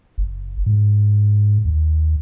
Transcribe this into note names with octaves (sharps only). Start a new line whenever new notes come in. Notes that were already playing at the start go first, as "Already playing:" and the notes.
F#1
G#2
D#2